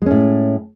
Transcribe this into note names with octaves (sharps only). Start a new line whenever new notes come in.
A2 G#3 C#4